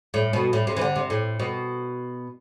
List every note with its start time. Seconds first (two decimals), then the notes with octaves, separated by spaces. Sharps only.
0.14 A2
0.33 B2
0.53 A2
0.67 C3
0.77 E3
0.81 D3
0.96 C3
1.10 A2
1.40 B2